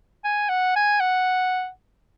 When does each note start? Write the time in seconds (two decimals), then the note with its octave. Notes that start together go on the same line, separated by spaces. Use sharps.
0.24 G#5
0.49 F#5
0.75 G#5
1.00 F#5